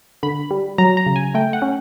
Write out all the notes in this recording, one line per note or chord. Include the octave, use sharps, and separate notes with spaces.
D3 B5
G3
F#3 A#5
A#5
C#3
G#5
A3 G5
F#5
C#4